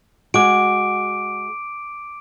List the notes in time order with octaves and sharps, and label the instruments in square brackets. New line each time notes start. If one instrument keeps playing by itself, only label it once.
[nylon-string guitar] G#3 F#4 [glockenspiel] D6 D7